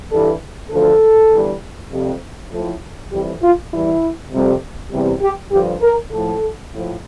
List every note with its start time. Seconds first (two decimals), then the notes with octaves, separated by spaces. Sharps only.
0.10 G2 E3 G3 A4
0.70 D2 D3 F3 A4
1.30 E2 D3 G3
1.91 F2 C3 G3
2.51 A2 F3
3.10 F2 C3 E3 G3 G4
3.41 F4
3.71 E2 E3 G3 E4
4.31 F2 C3 G3
4.91 E2 C3 G3
5.21 G4
5.52 G2 D3 F3 G4
5.82 A#4
6.11 A2 F3 A4
6.72 A2 F3